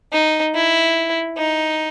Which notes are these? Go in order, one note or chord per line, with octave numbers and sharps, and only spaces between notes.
D#4
E4
D#4